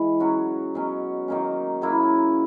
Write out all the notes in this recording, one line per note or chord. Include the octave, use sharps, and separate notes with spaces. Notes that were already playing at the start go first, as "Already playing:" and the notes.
Already playing: E3 G#3
C#3 F#3 C#4 F#4
B2 F#3 C#4
D#3 F#3 A#3 C#4
C#3 F#3 A#3 E4